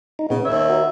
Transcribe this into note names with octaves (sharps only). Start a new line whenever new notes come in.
D#4
A#2 C#3 B3
D#2 C#5 E5
F#4 A#4